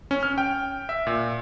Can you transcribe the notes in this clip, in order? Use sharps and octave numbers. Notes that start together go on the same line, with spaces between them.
C#4
F6
G5
E5
A#2